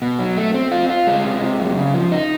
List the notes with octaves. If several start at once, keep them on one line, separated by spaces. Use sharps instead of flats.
B2
F#3
A3
C4
F4
F4
G#3
C3
C3
F#2
C#3
F3
D#4